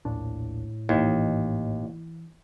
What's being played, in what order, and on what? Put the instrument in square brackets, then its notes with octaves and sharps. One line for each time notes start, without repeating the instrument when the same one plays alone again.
[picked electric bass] A#1 D#2 D4 [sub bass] A2
[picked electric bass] A1 G#2 [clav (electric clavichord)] D#2 [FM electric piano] E3